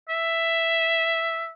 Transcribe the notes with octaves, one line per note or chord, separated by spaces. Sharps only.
E5